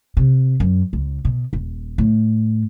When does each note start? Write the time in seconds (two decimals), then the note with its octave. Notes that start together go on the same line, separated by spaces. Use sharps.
0.17 C3
0.60 F#2
0.93 C#2
1.25 B2
1.53 D#1
1.98 A2